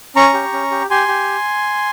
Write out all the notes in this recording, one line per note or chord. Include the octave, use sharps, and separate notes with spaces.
C#4 A#5 C#6
G4
C#4
G4
G4 G#5 C6
G4